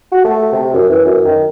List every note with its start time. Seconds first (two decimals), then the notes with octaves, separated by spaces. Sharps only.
0.12 F#4
0.24 A3
0.53 C3
0.73 F#2
0.89 E3
1.05 F#2
1.25 D#3